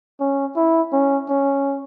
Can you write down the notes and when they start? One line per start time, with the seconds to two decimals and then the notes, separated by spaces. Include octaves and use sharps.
0.20 C#4
0.56 E4
0.93 C#4
1.29 C#4